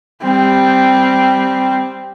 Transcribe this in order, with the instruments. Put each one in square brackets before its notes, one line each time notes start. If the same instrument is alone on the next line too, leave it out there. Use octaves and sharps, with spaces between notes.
[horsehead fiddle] G3 C4